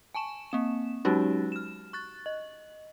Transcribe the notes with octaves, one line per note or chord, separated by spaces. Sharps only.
G#5 A5 C#6 E7
A#3 C4 E7
F#3 G#3 C#4 D#4 F#4 G4
F6 E7
C#6 F#6 A6
D#5